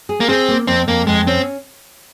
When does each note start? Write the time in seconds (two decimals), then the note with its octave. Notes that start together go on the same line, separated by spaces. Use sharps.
0.09 G#4
0.20 A#3
0.29 C4 G#4
0.48 A#3
0.67 F2 C4
0.87 F2 A#3
1.07 F2 G#3
1.27 C4 C#4